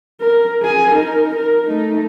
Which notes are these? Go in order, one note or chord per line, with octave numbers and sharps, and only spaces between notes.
A#4
G#4 G#5
D#4 A#4
A#4
A3 D#4